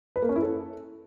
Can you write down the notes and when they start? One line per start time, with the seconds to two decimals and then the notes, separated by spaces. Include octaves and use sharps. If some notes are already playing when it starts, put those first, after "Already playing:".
0.16 B4
0.22 A#3
0.29 C#4
0.36 E4
0.42 A4